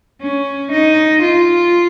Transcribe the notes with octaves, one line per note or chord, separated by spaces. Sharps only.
C#4
D#4
F4